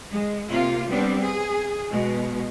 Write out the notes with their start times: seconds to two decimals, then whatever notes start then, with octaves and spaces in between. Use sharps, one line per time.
0.13 G#3
0.49 C3 A#3 F4
0.90 G3 B3 C4 D4
1.22 G#4
1.90 B2 G#3